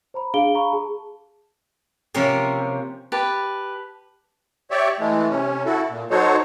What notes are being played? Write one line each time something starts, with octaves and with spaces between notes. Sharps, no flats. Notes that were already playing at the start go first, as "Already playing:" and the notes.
C5 A#5 B5
D4 G#4 F5 D7 G7
F5 A#5 B5 C#6
G#4 A5
C3 F3 A#3 C4 C#4
G4 B4 A5
G4 C#5 D5 E5
E3 G#3 A3
C3 C#4
E4 F#4 A4
A#2
F#3 D#4 F#4 A4 C5 C#5